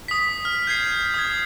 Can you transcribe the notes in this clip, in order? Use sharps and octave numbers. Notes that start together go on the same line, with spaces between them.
D#6 B6
F6
G6 G#6 C7
G6
D#6 G#6